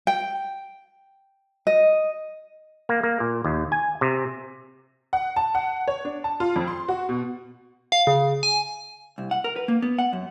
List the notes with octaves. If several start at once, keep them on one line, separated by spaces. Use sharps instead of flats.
G5
D#5
A#3
A#3
A#2
D#2
G#5
C3
F#5
A5
F#5
C#5
D4
A5
F4
F2
C6
F#4
B2
F5
C#3
G#5
C2
F#5
A#4
B4
A#3
B3
F#5
F#2